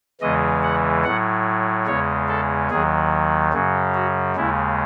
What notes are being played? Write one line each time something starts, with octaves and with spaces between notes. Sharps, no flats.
E2 C#3 E3 G#3 D#5
F#5
A2 F#3 F#5
E2 C#3 G#3 C#5
A4
D#2 D#3 F#3 G#4
F#2 C#3 F#3
F#4
D#2 C#3 G#3 E4